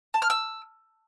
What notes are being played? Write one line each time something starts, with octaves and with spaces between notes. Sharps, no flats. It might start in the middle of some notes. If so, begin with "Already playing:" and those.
A5
F6
E6